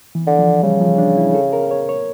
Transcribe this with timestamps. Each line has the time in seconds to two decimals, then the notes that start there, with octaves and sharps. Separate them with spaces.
0.15 E3
0.27 D3
0.39 F3
0.63 C#3 G3
0.81 F3
0.98 D4
1.17 E4
1.34 A4
1.53 A#4
1.71 C#5
1.89 C#5